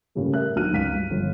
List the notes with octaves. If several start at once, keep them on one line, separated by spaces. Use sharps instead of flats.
A2 C#3 G3 A3 A#3
A#4 E5 F#6
B1 D4 F#4 F6 F#6 D#7
C#2 B6 D#7
G2 F5
G1 F3